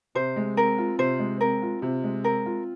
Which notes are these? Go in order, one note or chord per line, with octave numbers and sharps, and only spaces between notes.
C3 C5
G#3
C4 A#4
F4
C3 C5
G#3
C4 A#4
F4
C3
G#3
C4 A#4
F4